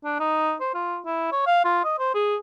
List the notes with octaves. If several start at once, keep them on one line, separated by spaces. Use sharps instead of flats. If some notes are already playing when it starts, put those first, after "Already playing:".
D4
D#4
C5
F4
E4
C#5
F5
F4
D#5
C5
G#4